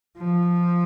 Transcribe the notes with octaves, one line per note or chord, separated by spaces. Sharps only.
F3